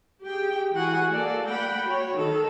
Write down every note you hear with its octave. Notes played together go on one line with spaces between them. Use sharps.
G4 G#4 G5
E3 F#4 G#4 F#5 G#5
A#3 A4 D5
A#3 F#5 G5 B5
F#4 C#5
D#3 A4